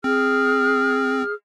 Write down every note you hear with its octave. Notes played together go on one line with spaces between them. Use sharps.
C4 G#4 F6